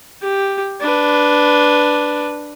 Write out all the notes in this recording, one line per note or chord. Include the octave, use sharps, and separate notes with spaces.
G4
D4 B4